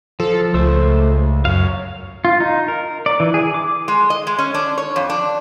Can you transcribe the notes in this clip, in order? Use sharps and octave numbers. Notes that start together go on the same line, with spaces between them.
F3 A4
C#2 A3 C5 E6
F#2 C#5 F5
F4
D#4
A#4
D5
E3
G#4
D6
G#3
D#5
G#3
C#4
D4
C#5
F2
D4